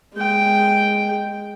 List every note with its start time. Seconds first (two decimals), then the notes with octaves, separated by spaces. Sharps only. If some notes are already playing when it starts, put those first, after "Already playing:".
0.14 G#3 G5